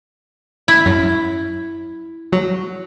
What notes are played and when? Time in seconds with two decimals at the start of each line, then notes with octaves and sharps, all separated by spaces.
0.68 E4
0.86 F#2
2.32 F#3